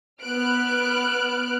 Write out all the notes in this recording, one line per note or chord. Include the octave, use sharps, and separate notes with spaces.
B3 F6 F#6 D7